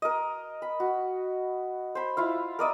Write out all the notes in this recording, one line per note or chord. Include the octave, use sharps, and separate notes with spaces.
A#4 D#5
B5
F#4
C5 B5
E4 F4 F5
A#4 D5 D#5 E6